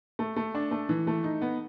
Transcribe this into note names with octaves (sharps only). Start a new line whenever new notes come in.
A3
A3
D4
A3
E3
A3
D#4
B3